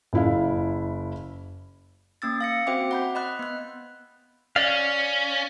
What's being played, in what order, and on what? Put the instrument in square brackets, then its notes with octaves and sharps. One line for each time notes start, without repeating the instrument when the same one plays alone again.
[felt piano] F#1 E4 F5
[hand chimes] A#3 C#4 E6 A6
F5 A#6 C#7
C4 F#4 C5 E5 G5 D6
F#5 B5 G6
D#5 B5 F#6
B3 F#6
[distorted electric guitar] C#4 [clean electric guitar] D5 F5